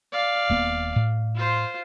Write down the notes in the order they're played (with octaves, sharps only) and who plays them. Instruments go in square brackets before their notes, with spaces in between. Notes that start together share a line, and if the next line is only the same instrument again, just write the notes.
[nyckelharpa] D5 F5
[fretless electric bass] D#1 A#3 B3
A2
[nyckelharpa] F4 C5